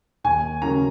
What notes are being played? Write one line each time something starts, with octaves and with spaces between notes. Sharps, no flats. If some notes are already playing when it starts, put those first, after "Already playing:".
D#2 G#5
C#3 F#3 A#3 C#4 A#5